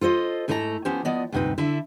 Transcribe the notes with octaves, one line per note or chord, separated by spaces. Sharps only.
F4 A4 C5 D#5
G#2 A3 E4 A4 D5 A#5
F3 B3 C#4 G4 C5
F3 B3 D5 D#5
D2 G2 C3 D#4 B4
D3 E4 E5